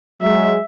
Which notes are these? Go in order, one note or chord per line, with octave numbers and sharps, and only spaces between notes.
F#3 G#3 E5